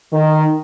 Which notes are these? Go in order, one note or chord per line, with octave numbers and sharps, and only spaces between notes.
D#3